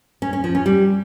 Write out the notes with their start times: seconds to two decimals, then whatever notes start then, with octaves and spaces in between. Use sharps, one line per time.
0.22 C#4
0.33 C#4
0.44 F3
0.55 C#4
0.66 G3